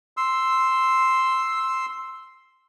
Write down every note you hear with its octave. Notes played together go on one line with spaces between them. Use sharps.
C6 E6